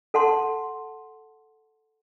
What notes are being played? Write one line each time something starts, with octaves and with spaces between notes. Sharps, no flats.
A4 F#5 A5 C6